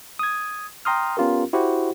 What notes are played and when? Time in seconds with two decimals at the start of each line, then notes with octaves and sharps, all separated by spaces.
0.19 D#6 G#6
0.85 G5 A#5 C6 D#6 F6
1.17 B3 C#4 F4 G4 A#4
1.53 E4 F#4 G4 C5 F#5